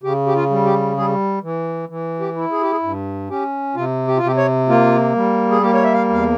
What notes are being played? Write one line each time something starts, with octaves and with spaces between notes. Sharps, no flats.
C#3 G4
G4
F4
G3
G4
G3 G#4
E3
E3
G4
E4
G#4
G4
G#4
G2
C#4 G4
C3 F4
G4
F4
C3 G4
C#5
A#3 F4
G3
G#4
A#3 G4
C#5
E5
F5
E2 F5